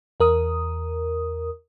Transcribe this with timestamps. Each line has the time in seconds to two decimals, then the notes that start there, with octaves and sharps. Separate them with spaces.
0.20 E2 A#4 D#6